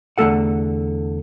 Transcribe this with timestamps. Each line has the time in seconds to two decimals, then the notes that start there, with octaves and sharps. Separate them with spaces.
0.18 E2 D3 G#3 A3 A4 F#5